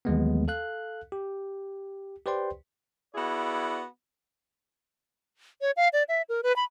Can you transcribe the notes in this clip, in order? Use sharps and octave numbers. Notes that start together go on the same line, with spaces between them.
D#2 E3 F#3 G#3 A3 B3
A4 F5 F#6
G4
G4 B4 C5 D5 G5 C6
B3 E4 F#4 G#4 D5
C#5
F5
D5
E5
A#4
B4
B5